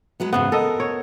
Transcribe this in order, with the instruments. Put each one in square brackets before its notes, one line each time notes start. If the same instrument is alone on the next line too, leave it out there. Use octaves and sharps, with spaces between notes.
[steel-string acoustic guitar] F#3 G#3 B3
[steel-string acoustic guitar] E2 G#2 C#3 [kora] B3
[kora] A4 D#5 [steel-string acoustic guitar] A#4
[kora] C#5